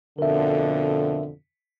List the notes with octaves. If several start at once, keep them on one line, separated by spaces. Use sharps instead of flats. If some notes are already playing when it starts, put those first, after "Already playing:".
F2 B2 D3 A#4 E5